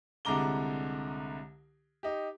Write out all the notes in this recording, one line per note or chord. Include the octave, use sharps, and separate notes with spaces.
C2 D3 G#3 A#5 D6 G7
D#4 G4